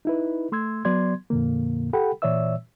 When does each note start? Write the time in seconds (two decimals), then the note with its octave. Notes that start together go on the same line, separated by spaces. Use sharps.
0.05 D#4 E4 B4
0.52 A3 C6 E6 G#6
0.85 F#3 B3 D5 C6 G#6
1.30 F2 A#2 D3 A#3
1.93 G4 A4 F#5 G5 B5
2.22 A#2 E3 C#5 D5 E5 E6